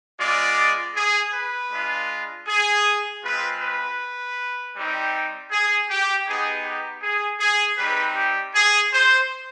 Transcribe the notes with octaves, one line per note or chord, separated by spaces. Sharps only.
G#3 B3 F4 D5
G#4
B4
G#3 D4 F4
G#4
G#3 C4 F4 B4
B4
G3 C4 D#4 G4
G#4
G4
B3 D#4 G4 G#4
G4
G#4
G#4
G3 C4 D#4 B4
G4
G#4
C5